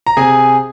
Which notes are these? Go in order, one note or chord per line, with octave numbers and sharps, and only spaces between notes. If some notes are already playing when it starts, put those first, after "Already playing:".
A#5
C3 G#4 G#5